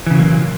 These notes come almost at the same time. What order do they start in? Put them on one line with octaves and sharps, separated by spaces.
E3 C#3 F#3 A#3 A#2